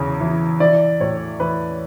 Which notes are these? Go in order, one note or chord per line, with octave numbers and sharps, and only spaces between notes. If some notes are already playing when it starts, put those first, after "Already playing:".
Already playing: E2 C#3
E3
E3 D5
A2 C#5
E3 B4